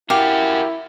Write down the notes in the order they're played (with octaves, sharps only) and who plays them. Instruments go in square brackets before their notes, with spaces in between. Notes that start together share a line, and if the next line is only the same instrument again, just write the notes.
[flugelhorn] E4 [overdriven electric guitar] F#4 A#4 [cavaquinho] G4 F5